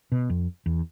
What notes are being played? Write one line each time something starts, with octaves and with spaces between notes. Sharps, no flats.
B2
F2
E2